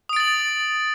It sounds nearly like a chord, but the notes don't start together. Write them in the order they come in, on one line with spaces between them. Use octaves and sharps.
D#6 D7 A6 F#7